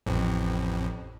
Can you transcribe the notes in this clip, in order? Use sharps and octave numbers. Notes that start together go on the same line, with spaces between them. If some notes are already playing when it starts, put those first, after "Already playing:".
A1 F2